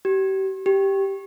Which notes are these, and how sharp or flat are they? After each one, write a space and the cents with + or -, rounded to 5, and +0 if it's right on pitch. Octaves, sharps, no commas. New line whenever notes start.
G4 -35
G4 -5